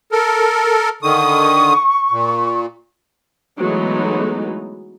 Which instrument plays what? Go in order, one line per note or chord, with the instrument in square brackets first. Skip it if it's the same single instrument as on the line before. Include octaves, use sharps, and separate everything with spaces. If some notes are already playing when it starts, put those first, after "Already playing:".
[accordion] A4 A#4
[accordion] D3 D#3 D#6 [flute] C#6
[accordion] A#2
[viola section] E3 F#3 G#3 A3 B3 D#4